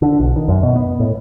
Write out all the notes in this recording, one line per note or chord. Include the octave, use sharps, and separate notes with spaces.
D3
B1
D#3
F#2
B2
B3
A2